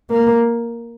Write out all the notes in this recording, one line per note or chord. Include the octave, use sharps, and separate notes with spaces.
A#3